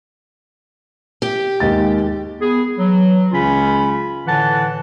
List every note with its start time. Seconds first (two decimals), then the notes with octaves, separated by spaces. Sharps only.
1.22 G4
1.60 D#2 G#3 A6
2.40 B3 G#4
2.77 E3 F#3
3.31 C#2 C#3 C#4 F4 B5
4.26 A2 D3 E3 F#5 A5